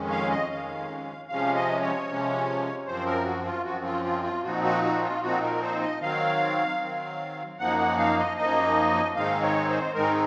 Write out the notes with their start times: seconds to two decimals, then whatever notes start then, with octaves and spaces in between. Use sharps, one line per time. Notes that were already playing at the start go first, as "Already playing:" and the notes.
Already playing: F2 D#3 G#3 C#4
0.10 F5
0.30 D#5
0.50 F2 D#3 G#3 C#4 F5
1.28 C3 F3 G#3 C#4 F5
1.55 D#5
1.81 C#5
2.08 C3 F3 G#3 C#4
2.86 F#2 F3 C4 C5
3.06 A#4
3.25 F#4
3.45 F4
3.65 F#2 F3 C4 F#4
3.84 F4
4.04 F4
4.24 F4
4.43 A#2 F3 C4 D#4 F#4
4.64 F#4
4.83 F#4
5.03 F4
5.22 A#2 F3 C4 D#4 F#4
5.43 A#4
5.62 C5
5.81 D#5
6.01 D#3 F#3 C4 F5
6.81 D#3 F#3 C4
7.59 F#2 F3 A#3 D#4 F#5
7.78 F#5
7.98 F5
8.18 D#5
8.37 F#2 F3 A#3 D#4 D#5
9.16 G#2 D#3 G#3 C4 D#4 F5
9.42 C#5
9.69 C5
9.94 G#2 D#3 G#3 C4 D#4 A#4